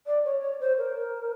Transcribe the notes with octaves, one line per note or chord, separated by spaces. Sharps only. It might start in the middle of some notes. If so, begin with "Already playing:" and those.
D5
C#5
C#5
C5
A#4